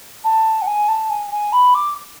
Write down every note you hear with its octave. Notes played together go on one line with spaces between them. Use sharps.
A5
F#5
G#5
A5
G#5
G#5
B5
D6